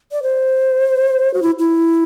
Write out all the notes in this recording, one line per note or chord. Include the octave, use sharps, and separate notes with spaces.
D5
C5
F#4
E4
E4